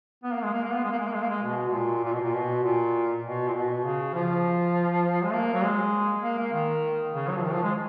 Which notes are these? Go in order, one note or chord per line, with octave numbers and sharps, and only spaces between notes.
B3
A#3
G#3
A#3
A#3
B3
G#3
A#3
G#3
A#3
G#3
A#3
G#3
B2
B2
A#2
A#2
B2
A#2
B2
A#2
B2
A#2
B2
C#3
F3
G#3
A#3
F#3
G#3
A#3
A#3
D#3
C#3
F#3
F3
D#3
F3
G#3